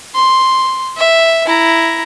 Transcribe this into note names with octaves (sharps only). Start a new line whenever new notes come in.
C6
E5
E4 A#5